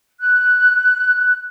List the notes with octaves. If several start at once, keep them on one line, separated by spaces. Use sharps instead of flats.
F#6